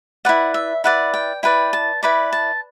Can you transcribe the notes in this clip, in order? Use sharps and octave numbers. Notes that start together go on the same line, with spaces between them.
E4 B4 D5 F#5
E5
E4 B4 D5 F#5
G5
E4 B4 D5 G5
A5
E4 B4 D5 B5
A5